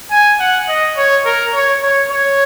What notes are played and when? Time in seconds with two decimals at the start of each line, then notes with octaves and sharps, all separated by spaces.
0.11 G#5
0.39 F#5
0.68 D#5
0.97 C#5
1.25 A#4
1.53 C#5
1.82 C#5
2.11 C#5